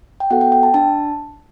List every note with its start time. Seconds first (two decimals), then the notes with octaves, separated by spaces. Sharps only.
0.20 G5
0.30 B3 F#4 A4 F#5
0.41 G5
0.52 G5
0.63 A5
0.74 D4 A5